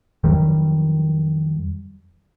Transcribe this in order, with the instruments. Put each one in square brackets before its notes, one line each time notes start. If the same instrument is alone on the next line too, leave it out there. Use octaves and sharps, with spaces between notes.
[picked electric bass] F2 D#3 F#3 G3